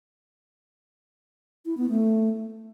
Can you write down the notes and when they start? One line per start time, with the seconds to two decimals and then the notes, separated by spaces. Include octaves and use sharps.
1.66 E4
1.77 B3
1.89 A3